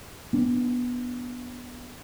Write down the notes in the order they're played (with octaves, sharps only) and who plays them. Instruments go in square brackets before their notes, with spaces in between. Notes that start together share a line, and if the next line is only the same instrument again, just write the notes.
[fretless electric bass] B3 D4